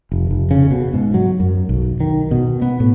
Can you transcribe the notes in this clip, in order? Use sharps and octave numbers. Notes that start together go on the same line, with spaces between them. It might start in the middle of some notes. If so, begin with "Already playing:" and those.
F1
F1
C#3
B2
G#2
F#3
F#2
B1
D#3
B2
B3
A2